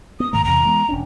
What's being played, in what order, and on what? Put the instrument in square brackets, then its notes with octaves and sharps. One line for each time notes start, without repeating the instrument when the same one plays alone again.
[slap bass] B3 [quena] D#6
[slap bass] G#2 D#3 A3 [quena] A#5
[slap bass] E2 C3 E3 [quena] A#5
[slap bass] E3 G#3 B3
E1 C#4 D4